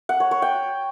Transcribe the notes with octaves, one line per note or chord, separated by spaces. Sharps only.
F#5
C#5
C#5
G5